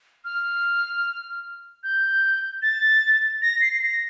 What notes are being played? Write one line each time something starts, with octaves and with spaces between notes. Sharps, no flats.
F6
G6
A6
A#6
C7
C7
A#6